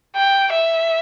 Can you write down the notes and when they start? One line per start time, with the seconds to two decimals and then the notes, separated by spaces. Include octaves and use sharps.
0.16 G5
0.52 E5